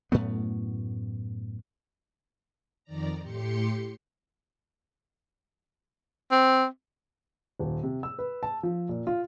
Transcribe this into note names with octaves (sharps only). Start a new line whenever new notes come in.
F#2 A2 A3 B3
F2 D#3 D5 A#5
A2 G4 C6 C#7
C4
D#1
C3
E6
B4
A5
F3
A#2
F4